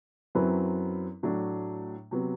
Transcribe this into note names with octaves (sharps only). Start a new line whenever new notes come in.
F#2 F#3 C4 E4 B4
A2 F#3 A3 D4
C3 F#3 B3